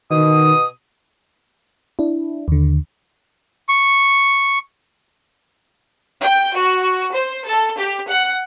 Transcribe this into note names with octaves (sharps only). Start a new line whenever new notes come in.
B2 D#3 D#6
D4 E4
D#2 D3
C#6
G5
F#4
C5
A4
G4
F#5